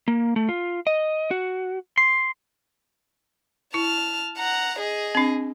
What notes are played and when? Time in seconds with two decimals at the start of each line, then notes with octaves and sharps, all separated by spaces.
0.08 A#3
0.36 A3
0.49 F4
0.87 D#5
1.31 F#4
1.98 C6
3.74 E4 A5 F6
4.38 F#5 A#5
4.79 G#4 D#5
5.15 C4 D4